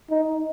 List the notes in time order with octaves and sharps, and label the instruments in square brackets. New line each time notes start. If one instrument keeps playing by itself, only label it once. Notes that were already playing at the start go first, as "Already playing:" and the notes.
[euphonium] D#4